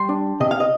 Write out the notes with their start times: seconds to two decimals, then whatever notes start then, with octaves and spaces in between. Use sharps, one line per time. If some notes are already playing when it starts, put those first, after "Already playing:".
Already playing: G3 C6
0.09 D4
0.40 C3 D#5
0.51 F5
0.60 D#5